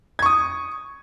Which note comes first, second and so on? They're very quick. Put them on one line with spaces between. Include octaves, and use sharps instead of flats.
G#6 C#6 D#6